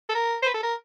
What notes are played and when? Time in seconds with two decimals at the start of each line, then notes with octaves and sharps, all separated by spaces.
0.09 A4
0.14 A#4
0.43 C5
0.46 B4
0.54 A4
0.63 A#4